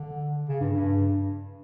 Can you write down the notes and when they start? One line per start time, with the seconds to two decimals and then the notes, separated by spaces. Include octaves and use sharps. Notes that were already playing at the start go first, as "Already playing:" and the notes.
Already playing: D3
0.49 C#3
0.60 G2
0.73 G2